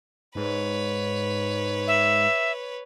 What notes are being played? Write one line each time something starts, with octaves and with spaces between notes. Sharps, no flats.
G#2 B4 C#5
E5